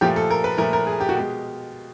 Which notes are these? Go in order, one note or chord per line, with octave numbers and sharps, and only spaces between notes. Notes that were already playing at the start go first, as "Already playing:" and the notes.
A#2 F3 A3 G4
A4
A#4
B4
A#2 F3 A3 A#4
A#4
G#4
G4
F#4
B2 G#3 G4